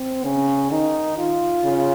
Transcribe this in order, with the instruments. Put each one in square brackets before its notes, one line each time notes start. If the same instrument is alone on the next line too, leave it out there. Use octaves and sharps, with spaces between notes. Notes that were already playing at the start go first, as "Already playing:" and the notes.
Already playing: [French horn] C4
[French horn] C#3 [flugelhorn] C#4
[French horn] D#3 [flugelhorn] D#4
[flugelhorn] F4
[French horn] C#3